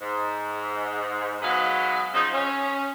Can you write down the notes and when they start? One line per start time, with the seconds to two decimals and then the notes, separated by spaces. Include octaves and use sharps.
0.01 G#2
1.42 G#2 F#3 B3 B4 D#5 F5
2.14 C#3 F3 F#3 C4 D#4
2.34 C#4